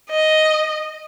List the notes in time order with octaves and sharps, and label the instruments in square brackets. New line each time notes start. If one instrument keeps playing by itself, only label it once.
[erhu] D#5